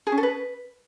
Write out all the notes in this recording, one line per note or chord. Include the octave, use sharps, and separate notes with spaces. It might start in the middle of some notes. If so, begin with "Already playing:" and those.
G#4
C#4
A4
B4